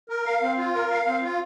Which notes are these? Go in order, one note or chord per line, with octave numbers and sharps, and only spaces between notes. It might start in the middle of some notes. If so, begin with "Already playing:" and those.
A#4
F5
C4
F4
A#4
F5
C4
F4